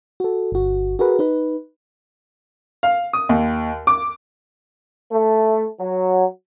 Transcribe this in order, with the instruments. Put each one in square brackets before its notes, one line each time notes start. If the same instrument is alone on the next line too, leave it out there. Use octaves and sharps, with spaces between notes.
[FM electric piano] F#4 A4
G1 F#4
F#4 G#4 A#4 B4
D#4 B4
[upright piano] F5
D#6
D#2
D6
[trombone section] A3
F#3